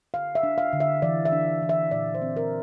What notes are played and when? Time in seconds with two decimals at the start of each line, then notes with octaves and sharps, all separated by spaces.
0.14 D3 F5
0.35 E5
0.43 D4
0.58 F5
0.73 D3
0.80 E5
1.02 E3 D5
1.25 E5
1.32 D4
1.62 E3
1.69 E5
1.91 A#2 D5
2.14 C5
2.22 C4
2.37 A#4